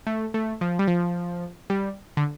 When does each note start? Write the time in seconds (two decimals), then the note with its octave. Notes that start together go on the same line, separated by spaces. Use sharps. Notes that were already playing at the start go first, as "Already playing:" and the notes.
0.07 A3
0.34 A3
0.61 F3
0.79 G3
0.88 F3
1.70 G3
2.17 D3